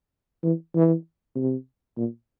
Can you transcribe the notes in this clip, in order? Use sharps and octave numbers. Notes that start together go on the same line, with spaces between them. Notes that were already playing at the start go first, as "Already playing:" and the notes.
E3
E3
C3
A#2